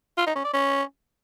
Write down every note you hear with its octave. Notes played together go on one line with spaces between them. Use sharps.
F4
D#4
C#4
D5
C#4